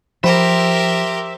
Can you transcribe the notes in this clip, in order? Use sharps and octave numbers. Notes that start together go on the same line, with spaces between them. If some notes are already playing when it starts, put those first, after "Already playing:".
F3 G4 A#4 C5 E5